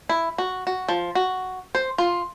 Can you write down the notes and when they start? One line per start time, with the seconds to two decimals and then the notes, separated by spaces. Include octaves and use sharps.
0.09 E4
0.38 F#4
0.67 F#4
0.88 F3
1.15 F#4
1.75 C5
1.98 F4